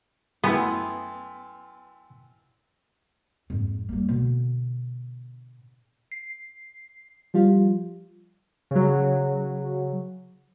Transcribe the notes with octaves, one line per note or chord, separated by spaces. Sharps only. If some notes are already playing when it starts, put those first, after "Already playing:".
F#2 A3 B3 E4 G5 G#5 C6
F2 G#2
G3 A#3
B2 D3
C7
F3 G3 F4
C#3 F#3